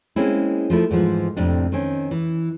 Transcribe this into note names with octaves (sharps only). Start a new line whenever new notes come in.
G#3 A#3 C4 C#4 E4
F3 A3 E4
G#2 E3 F3 B4
F2 A2 C3 D4
D#3 C4 C#4
E3